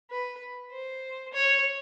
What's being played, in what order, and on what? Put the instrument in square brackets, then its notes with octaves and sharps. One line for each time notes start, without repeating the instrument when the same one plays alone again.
[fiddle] B4
C5
C#5